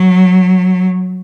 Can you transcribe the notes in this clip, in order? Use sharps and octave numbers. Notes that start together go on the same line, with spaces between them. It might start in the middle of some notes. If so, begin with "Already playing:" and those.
Already playing: F#3